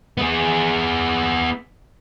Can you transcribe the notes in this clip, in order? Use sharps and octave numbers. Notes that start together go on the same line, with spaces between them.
B3 G#4